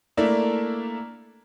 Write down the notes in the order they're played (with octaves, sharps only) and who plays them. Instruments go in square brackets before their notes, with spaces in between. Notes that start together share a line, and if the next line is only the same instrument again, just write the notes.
[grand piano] A3 A#3 D4 E4